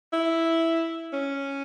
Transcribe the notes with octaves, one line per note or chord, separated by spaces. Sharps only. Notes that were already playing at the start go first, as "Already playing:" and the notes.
E4
C#4